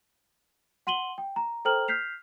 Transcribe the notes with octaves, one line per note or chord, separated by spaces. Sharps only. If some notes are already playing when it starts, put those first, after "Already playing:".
F#5 C6 D#7 F#7 G7
G5
A#5
A4 C5 G5 A#5 F6 F#7
F6 G6 B6 C7 F7